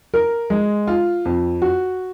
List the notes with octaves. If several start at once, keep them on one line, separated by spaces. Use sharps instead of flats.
A#4
G#3
F4
F2
F#4